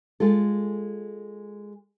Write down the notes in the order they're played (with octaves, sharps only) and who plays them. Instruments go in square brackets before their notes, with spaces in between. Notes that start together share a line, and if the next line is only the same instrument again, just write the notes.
[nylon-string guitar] G#3 F4 A4